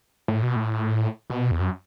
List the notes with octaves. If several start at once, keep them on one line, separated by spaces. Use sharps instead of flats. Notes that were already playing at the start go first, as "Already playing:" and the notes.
A2
B2
A2
B2
E2
F#2